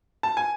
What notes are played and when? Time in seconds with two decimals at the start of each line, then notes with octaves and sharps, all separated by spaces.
0.23 A5
0.37 G#5